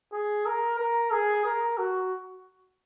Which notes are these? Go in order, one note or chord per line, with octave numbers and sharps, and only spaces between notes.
G#4
A#4
A#4
G#4
A#4
F#4